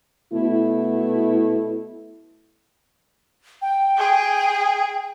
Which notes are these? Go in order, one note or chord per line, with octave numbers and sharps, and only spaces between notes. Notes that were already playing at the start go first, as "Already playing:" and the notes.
B2 A3 B3 E4
G5
G#4